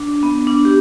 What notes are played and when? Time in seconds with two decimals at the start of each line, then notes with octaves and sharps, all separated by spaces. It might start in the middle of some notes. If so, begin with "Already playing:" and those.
Already playing: D4
0.23 B3
0.47 D4
0.65 G4